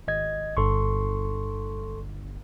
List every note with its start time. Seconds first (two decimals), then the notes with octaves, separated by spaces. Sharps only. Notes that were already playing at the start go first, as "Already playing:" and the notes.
0.08 G#1 D#5 G#6
0.57 G1 G2 A4 C6 C#6